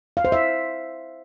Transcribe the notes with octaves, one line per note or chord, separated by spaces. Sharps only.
F5
C5
E5